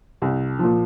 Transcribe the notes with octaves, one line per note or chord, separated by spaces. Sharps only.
C2
A#2 F3